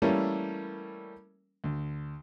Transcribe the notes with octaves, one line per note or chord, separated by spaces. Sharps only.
E3 G3 A3 A#3 C#4 E4
D2